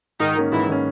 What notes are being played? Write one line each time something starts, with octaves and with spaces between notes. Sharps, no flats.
G#2 D#3 D#4
D#3 A#3 C#4
G#2 E3 E4
D#3 A#3 C#4